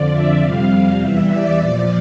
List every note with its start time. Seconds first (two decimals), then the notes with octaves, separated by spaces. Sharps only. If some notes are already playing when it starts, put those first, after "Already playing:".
Already playing: F2 D3 F3 D5
0.11 E5
0.40 F2 C3 G3 F5
0.99 E2 E3 G3 E5
1.29 D5
1.59 A#2 F3